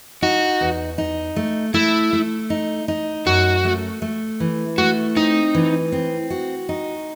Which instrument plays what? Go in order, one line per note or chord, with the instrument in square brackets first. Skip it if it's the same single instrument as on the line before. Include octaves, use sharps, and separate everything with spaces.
[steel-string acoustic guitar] D#4 [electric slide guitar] F#4
[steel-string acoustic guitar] E2
D#4
A3
[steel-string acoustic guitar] A3 [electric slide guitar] E4
[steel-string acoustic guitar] A3
D#4
D#4
[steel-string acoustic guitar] F#2 [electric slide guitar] F#4
[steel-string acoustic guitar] A3
A3
E3
[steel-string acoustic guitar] A3 [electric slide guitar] F#4
[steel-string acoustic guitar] C4 [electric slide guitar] D#4
[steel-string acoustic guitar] E3
C4
F#4
D#4